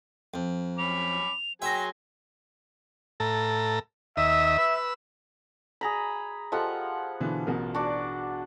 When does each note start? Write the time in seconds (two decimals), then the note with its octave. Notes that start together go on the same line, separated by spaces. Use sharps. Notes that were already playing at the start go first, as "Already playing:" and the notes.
0.34 F2
0.78 C#4 B5 D6 F7
1.62 F#3 G#4 E5 G5 G#5 C6 A#6
3.20 A2 A4 A#5
4.17 D#2 D#5 E5 E6
4.58 B4 E6
5.81 G#4 A#5 B5
6.52 F3 G4 A4 D#5 F#5
7.20 B2 D3 E3
7.47 A1 B2 A#4
7.75 D4 F#4 D6